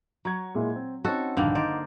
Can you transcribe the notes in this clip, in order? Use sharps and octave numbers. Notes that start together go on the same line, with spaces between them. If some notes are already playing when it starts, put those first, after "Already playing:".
F#3 A#5 C#6 G#6
A#2 G#3 E4
C4
C4 C#4 D#4 F#4 A4
A#1 G2 D3 D#3 A#3
D#4 A#4 C5 D5